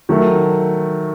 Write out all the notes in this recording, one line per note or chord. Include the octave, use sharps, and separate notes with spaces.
D#3 F#3 A3